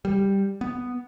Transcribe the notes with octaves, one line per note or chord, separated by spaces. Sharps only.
G3
B3